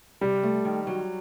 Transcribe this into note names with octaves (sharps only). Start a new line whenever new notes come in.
C3 G3
A3
D#3
F#3